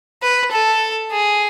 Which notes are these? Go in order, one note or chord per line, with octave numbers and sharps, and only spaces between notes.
B4
A4
G#4